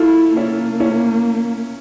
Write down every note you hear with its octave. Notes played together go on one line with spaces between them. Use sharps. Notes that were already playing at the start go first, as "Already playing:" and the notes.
Already playing: E4 F4 A4
A#3 C#4 E4
C#4 E4